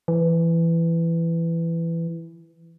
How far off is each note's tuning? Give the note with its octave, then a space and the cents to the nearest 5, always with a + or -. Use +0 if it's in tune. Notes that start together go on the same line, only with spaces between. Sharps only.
E3 +15